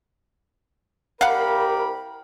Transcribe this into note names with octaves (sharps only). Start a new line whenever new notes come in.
C2 G4 A#4 F5 F#5 B5